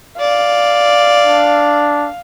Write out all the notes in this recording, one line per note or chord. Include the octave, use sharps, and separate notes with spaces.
D5 F5
D4